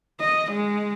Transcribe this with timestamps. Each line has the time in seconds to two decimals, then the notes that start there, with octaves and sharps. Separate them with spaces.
0.20 D#5
0.51 G#3